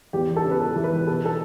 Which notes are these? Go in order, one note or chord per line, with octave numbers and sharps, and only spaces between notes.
E2 G4
A4
C#3
B4
A4
E3
B4
B2 A4
A4